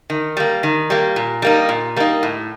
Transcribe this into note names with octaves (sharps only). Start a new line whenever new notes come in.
D#3
G3 A#3
D#3
G3 A#3
A#2
G3 A#3 D#4
A#2
G3 A#3 D#4
A2